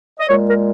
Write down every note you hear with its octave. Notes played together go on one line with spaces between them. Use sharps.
D#5
A#2 G#3 C#5
A#4